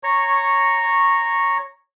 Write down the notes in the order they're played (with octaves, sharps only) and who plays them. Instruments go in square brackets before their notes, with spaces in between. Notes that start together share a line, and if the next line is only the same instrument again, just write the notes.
[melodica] C#5 A#5 C#6